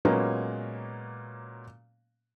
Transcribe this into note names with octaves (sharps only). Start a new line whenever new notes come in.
A#2 F#3 G#3 A#3 B3 C#4